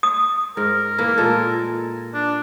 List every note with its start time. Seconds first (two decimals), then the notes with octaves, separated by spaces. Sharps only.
0.03 D#6
0.57 G#2 A#4
0.98 E3 A#3 E4
1.18 A#2 G#3 A4
2.14 D4